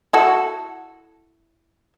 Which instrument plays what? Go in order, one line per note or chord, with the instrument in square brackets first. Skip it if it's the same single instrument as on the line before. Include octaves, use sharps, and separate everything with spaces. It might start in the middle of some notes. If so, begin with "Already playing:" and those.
[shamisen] E4 F#4 A4